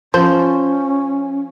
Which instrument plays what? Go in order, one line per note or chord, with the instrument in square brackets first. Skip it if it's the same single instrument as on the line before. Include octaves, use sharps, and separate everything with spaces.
[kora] F3 [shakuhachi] C#4 [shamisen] C5